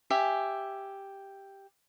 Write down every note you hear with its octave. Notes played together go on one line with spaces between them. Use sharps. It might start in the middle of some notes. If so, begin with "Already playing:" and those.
G4 E5 G#5